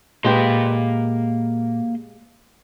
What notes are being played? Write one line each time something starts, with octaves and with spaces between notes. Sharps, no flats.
A#2 G#3 A#3 G4 B4 C6